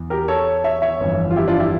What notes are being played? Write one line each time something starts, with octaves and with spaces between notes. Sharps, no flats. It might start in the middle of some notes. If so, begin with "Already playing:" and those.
Already playing: E2 E3
G4 A#4
A4 C#5
C#5 E5
C#5 E5
G1 F2 E3
F4
E4 G4
D4 F4
E4 G4